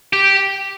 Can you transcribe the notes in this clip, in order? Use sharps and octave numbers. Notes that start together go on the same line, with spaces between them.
G4